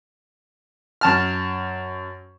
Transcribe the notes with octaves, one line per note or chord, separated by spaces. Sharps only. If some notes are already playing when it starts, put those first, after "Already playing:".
F#2 A5 F6